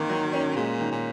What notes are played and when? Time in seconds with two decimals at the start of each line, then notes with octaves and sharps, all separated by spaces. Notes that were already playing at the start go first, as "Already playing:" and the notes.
Already playing: D#3 E3 A#3 C4
0.10 F#3
0.33 C#4
0.56 A#2 G#3
0.80 D#3
0.91 A#2